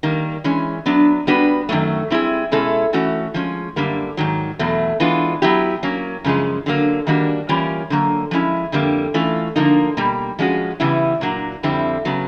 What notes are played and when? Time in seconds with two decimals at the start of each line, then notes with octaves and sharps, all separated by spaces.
0.03 D#3 G3 A#3
0.44 E3 G#3 C#4
0.86 F#3 B3 D4
1.27 G3 B3 D4 F#4 B4
1.69 F#2 D#3 F#3 A3
2.10 G3 C4 E4 G#4
2.52 B2 G#3 C#4 E4 A4
2.93 E3 A3 C#4 F#4
3.34 F3 G#3 C#4
3.76 F#2 D3 G3 A#3
4.17 G#2 D#3 F#3
4.59 E2 B2 F#3 A3
5.00 E3 G#3 B3 D4 F4
5.42 F#3 B3 E4 G4
5.83 F#3 A#3 C#4
6.24 F#2 C#3 F3 G#3
6.66 D3 F#3 A#3
7.07 D#3 G3 A#3 D4 F#4
7.49 E3 G3 A#3 C#4 F4
7.90 D3 F#3 A#3
8.31 F3 G#3 C#4 E4
8.72 F2 D3 G3 A#3
9.14 E3 A3 C#4 F4
9.56 D3 F3 A#3 D#4
9.97 B2 G3 A#3
10.39 F3 G#3 C#4 F#4
10.80 C#3 E3 G3 B3 E4
11.21 A#2 F#3 A#3 D4 F#4
11.63 F2 D3 G3 C4 E4
12.05 C#3 F#3 B3